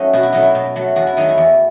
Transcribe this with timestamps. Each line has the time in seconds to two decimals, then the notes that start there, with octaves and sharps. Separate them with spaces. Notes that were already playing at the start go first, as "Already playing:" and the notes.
Already playing: F#3 A3 C#4 D#4
0.13 B2 F#4
0.23 E4
0.33 F#3 A3 D#4
0.43 E4
0.55 B2
0.76 F#3 A3
0.96 E2 F#4
1.07 E4
1.17 D#3 F#3 A3 D#4
1.29 E4
1.38 E2